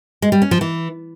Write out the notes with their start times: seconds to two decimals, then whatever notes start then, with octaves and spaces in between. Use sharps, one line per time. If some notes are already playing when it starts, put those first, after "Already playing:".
0.22 G#3
0.32 G3
0.42 C#4
0.51 F3
0.61 E3